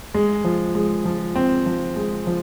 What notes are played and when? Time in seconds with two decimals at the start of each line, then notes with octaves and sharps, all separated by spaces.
0.14 G#3
0.44 F3
0.75 G#3
1.05 F3
1.36 C4
1.66 F3
1.96 G#3
2.27 F3